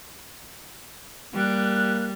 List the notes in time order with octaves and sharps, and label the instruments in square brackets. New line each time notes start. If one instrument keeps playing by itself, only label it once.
[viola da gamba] G3 [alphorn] A#3 [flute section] F#6